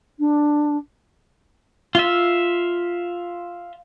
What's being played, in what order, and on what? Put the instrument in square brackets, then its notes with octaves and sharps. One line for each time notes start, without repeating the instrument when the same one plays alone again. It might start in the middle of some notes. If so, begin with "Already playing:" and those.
[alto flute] D4
[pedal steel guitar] F4 E5